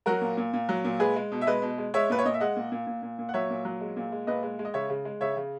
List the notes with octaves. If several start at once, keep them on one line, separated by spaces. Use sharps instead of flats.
F#3 F#4 A#4
A#2
A#2
A#2
F#3
A#2
G#3 G#4 B4
G#3
B2
E5
G#3 B4 D#5
B2
G#3
G#3 C#5 E5
A#2 B4
C#5
A#2 D#5
E5
G#3 D#5 F#5
A#2
A#2
A#2
A#2
A#2
F#5
F#3 C#5 E5
A#2
F#3
G#3
A#2
G#3
A#2 B4 D#5
G#3
G#3
D#5
C#3 C#5 E5
C#3
G#3
C#3 C#5 E5
C#3